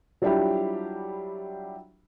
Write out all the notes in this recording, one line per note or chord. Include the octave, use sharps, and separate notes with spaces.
F#3 G3 D4 E4 F4 G4